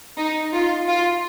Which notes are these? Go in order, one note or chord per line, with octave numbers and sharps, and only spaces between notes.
D#4
F4
F4